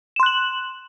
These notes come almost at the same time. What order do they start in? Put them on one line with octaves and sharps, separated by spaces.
E7 C6 F#6 F#7